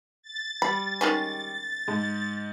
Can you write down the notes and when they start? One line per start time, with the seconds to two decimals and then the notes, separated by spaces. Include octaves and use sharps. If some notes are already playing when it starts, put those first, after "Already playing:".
0.22 A6
0.62 G3 B5
1.01 D#3 G#3 C#4
1.88 G#2